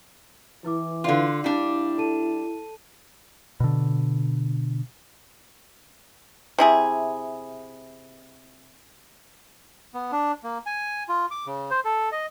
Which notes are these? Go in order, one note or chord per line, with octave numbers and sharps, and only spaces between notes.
E3 E4 B4 D6
D3 F4 D5 F5
G3 D4 E4
A4 A5 D#7
B2 D3
C3 E4 G#4
B3
D4
A#3
G#5
F4
D6
C#3
C5
A4
D#5